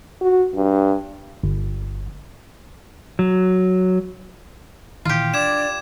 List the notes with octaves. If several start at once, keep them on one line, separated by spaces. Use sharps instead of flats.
F#4
G2
G1
F#3
A#2 D#3 E3 F4 G4
D4 D5 D6 G#6 E7